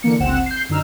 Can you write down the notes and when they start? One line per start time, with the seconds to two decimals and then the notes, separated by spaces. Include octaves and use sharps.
0.03 D3 E3 A#3 C#7
0.20 G1 C#2 C4 F#5 E7
0.46 G6 C7
0.69 F#2 D3 D#4 E6 F6